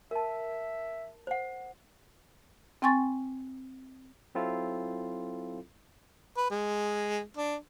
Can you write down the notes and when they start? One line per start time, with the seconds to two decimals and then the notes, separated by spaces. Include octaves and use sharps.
0.11 A#4 E5 A5
1.27 C5 F#5
2.82 C4 G5 G#5 C6 C#6 A6
4.35 F#3 C4 E4 F4 A4
6.37 B4
6.51 G#3
7.37 D4